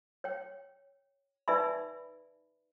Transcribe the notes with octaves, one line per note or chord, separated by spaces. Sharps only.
C#5 G5
D#4 B4 D5 E5 G#5 B5